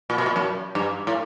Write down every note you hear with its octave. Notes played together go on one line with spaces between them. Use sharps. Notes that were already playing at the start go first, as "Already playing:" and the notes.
A#2
B2
A#2
F#2
G2
A2